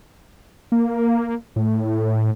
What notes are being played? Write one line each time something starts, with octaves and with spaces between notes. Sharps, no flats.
A#3
A2